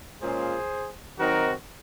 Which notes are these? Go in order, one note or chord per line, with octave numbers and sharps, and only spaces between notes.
A#2 G#3 C#4 F4 G#4 C5
D#3 F#3 C4 D#4 F#4 A#4